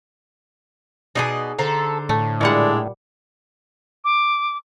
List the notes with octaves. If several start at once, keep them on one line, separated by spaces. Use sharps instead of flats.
B2 D#4 G#4 D5 D#5
D3 A4 C5 A#5
A2 A3
A#2 G3 G#3 D4 E4 F#5
D6